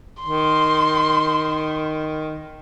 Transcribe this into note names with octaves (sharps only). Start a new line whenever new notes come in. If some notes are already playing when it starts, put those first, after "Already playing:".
D#3 C6